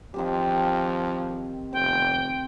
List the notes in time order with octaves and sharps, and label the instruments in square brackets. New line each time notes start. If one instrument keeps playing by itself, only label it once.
[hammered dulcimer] D#3 C4 G4 [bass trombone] F3
[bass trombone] F1 [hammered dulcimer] C4 [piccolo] G5